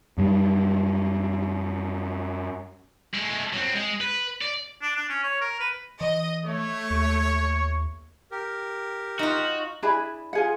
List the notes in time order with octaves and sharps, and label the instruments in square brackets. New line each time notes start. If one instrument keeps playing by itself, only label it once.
[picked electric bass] F#2 G3
[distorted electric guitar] G#3 A3
F#3 C4
G#3
B4
D5
[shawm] D4
D4
C#4
C#5
A#4
B4
[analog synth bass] E3 [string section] D#5
[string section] A3 [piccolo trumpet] C#5
[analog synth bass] D#2 [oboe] C#6
[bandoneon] G4 A#4
[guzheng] D#4 F4 [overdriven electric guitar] F#4
[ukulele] D4 E4 G#4 B5
F4 G#4 F#5